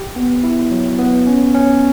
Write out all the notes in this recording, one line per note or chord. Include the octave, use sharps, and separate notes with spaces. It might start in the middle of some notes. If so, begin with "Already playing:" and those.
Already playing: G4
B3
E4
F#3
B3
C#4
C#4